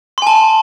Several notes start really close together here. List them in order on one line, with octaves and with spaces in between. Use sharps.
C6 G#5 A5